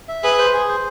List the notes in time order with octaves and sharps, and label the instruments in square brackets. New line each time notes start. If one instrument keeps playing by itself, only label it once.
[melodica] E5
[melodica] G#4 [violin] B4
[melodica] C5
G#4
C5